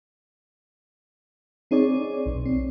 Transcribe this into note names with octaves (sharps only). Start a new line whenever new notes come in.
C4 D#4 G#4 C#5 D5
B1
C4